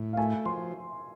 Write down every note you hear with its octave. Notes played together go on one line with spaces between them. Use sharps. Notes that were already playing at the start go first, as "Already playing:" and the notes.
Already playing: A2
F5
A3 G#5
F3 C6